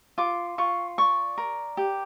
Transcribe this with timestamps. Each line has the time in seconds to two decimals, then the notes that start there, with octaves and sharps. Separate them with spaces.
0.18 F4 D6
0.58 F4 C#6
0.98 D5 C#6
1.38 A#4
1.77 G4